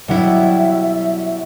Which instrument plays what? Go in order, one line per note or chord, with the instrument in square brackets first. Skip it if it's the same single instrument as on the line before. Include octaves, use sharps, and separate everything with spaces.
[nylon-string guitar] B2 E4 [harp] F#3 G3 [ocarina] E5